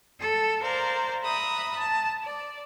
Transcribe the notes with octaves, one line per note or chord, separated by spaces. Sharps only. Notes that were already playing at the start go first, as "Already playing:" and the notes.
A4
A#4 C5 D5 F5
E5 A#5 B5 D#6 F#6
A5
D5